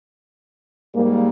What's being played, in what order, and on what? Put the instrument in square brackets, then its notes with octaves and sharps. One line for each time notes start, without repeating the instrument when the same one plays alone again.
[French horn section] G#2 G3 A#3